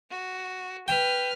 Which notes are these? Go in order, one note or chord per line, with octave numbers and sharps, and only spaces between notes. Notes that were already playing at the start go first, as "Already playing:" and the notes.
F#4
B4 G5 F6